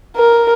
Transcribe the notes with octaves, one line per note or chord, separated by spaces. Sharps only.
A#4